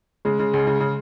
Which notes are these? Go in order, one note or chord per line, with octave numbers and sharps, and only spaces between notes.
C#3 G#3
C#3
C#2
C#3
C#3